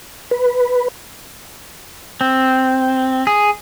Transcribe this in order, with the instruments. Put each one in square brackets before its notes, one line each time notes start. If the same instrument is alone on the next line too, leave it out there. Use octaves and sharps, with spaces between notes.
[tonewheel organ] B4
[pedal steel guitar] C4
G#4